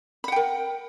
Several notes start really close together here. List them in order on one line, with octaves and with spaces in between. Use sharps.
B5 F#5 G5 A#4